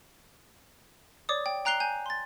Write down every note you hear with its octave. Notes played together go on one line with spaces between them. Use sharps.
C#5 D5 D6 D#6
G5
G5 A#5 F#6 C7 F7 G7
G#5 G6
C6 A6